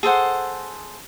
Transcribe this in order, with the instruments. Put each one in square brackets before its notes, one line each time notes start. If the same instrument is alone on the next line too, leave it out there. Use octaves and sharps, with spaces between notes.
[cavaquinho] G#4 A4 C5 F#5